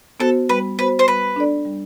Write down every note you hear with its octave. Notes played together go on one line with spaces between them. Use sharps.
B3 F#4 A4 C5
G3 B4
B3 F#4 B4 C5
C5
G3 B4
D4 A4 D5
G3